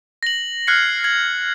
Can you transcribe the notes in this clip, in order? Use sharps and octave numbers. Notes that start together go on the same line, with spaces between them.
A#6 F#7
F6 F#6 G#6 C7 C#7
G#6 F#7